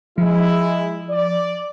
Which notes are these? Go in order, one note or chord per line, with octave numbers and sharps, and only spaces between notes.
F3 G#3 E4
D5